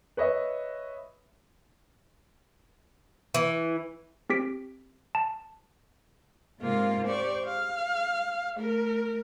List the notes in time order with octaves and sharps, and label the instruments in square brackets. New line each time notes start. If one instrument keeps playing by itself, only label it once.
[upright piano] B4 C#5 D#5 E5
[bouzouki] E3
[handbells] C4 G4 B6 D7
A5
[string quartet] G#2 C3 G#3 A#3 F4 F5
G4 C5 D5 C#6
F5
A3 A#4